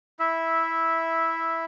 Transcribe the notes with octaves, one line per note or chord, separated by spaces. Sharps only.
E4 E5